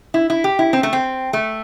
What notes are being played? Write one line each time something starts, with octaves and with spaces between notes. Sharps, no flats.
E4
E4
G4
E4
C4
A3
C4
A3